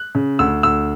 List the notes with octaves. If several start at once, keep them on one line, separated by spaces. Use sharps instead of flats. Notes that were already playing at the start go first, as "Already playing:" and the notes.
Already playing: F#6
C#3
D2 E6
D2 E6